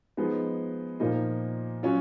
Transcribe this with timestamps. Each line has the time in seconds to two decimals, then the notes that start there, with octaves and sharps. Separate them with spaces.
0.17 F3 G#3 B3 D#4
1.00 A#2 F3 A#3 D#4
1.83 F#3 C#4 F4